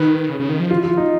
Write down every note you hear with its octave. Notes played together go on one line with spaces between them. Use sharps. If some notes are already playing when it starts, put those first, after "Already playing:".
Already playing: D#3 B4
C#3
C#3
D#3
F3
F4
F4
D#4